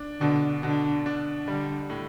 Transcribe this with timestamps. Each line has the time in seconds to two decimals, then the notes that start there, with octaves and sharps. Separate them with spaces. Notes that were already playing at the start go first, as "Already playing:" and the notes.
Already playing: D4
0.21 B2 D3
0.63 B2 D3
1.06 D4
1.47 D3 G3
1.90 A2